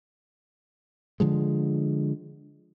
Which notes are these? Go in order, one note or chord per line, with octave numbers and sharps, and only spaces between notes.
D3 F3 G#3